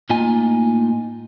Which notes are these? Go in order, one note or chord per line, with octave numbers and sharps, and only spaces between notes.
A2 A#3 D#4 F4 G#5